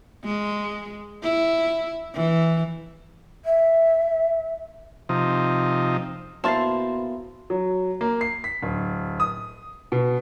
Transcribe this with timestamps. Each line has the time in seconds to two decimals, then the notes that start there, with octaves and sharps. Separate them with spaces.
0.24 G#3
1.23 E4
2.14 E3
3.45 E5
5.09 C3 F3 D#4
6.44 B2 A#3 E4 C5 A5 A6 C7
7.50 F#3
8.01 A#3
8.21 C7
8.44 B6
8.62 D1
9.20 D#6
9.92 B2